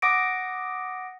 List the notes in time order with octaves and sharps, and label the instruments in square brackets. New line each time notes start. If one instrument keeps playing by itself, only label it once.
[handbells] F#5 D6 D#6 A#6 D7